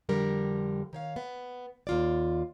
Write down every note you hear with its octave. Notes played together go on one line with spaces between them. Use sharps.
F2 D3 G3 A#4
D#3 C#5 F5
B3
D#2 F4 D5